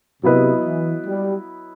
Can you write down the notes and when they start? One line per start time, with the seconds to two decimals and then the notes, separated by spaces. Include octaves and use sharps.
0.23 C3 F#3 B3 E4 B4 D#5
0.65 E3
1.06 G3